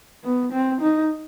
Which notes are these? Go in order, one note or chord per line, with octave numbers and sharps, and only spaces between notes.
B3
C4
D#4